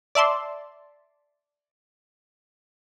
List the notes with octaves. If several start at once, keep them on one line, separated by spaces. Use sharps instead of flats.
D5 E5 A5 C6